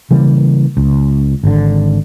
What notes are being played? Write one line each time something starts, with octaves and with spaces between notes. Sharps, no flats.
C#3 E3 G3 A#3
C#2
G#1 D3